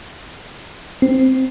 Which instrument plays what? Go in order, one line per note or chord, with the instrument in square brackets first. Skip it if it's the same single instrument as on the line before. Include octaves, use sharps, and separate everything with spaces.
[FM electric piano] C4